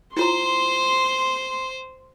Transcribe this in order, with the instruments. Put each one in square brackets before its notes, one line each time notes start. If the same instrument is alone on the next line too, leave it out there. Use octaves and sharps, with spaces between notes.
[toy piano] E4 F4 A#5 [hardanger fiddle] C5 [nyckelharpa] C6